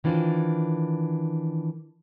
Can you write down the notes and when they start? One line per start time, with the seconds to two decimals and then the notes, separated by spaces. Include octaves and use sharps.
0.04 D#3 E3 D4 F4 C5